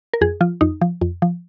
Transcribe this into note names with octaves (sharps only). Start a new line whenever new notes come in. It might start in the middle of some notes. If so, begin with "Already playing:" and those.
A#4
F2 G#4
F3 F4
F2 D#4
F3
F2
F3